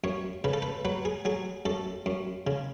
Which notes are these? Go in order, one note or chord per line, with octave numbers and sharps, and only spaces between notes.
F#2 C#5
C#3 B4
A4
B4
F#3 B4
G#4
F#3 G#4
F#2 A4
F#2
C#3